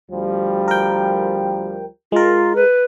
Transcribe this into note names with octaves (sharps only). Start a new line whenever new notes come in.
D2 F3 G3
A#4 G5
G#3 F4 A#4
B4